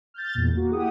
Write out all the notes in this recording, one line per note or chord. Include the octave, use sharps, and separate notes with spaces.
F6 G6 A6
E2 A#2
A#3 F#4
E4 G4 G#4 F#5 D#6